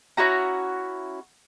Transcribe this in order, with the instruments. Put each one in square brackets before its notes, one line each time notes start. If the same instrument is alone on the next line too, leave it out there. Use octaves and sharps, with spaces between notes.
[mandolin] C#4 E4 F#4 A#5